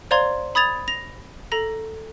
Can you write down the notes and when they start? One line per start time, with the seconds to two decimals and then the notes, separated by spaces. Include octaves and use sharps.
0.11 C5 D5 F5 A#5 C6 G#6
0.55 B5 D#6 G#6 A6 F7
0.88 A#6 F7
1.52 A4 A#5 A#6